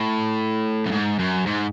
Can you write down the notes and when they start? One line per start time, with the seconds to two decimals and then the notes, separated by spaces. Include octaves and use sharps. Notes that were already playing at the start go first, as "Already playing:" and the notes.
Already playing: A2
0.86 F#2
0.92 G#2
1.19 F#2
1.47 G#2